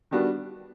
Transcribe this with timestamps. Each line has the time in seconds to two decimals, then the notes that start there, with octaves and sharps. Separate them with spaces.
0.11 D#3 G3 B3 D4 F#4